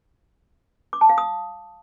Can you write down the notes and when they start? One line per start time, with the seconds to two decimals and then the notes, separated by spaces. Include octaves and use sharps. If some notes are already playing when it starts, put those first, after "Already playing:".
0.93 D6
1.01 A5
1.09 F5
1.18 D#6